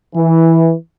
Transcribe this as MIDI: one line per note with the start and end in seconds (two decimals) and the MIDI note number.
0.15 0.72 52